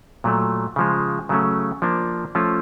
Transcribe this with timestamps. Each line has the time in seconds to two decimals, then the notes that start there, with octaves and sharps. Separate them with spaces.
0.24 A#2 F#3 A3
0.76 C#3 F3 G#3
1.29 C#3 F#3 A3 C#4
1.82 F3 A#3 D4
2.35 F3 A3 C#4 F4